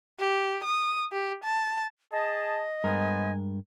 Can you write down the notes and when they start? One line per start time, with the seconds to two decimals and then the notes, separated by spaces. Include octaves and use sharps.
0.20 G4
0.64 D#6
1.12 G4
1.44 A5
2.12 G#4 D#5 A5
2.84 G2 G#3 B3 A#4 C5 G#5